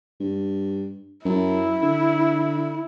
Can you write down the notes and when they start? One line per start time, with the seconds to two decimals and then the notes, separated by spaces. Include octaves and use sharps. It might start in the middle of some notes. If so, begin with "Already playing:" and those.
0.20 G2
1.25 F#2 E4
1.82 D3